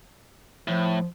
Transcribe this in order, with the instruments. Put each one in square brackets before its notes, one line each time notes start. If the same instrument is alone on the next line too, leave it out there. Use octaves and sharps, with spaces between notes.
[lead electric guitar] A2 [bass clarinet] F3